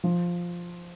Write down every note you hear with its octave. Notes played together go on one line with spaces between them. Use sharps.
F3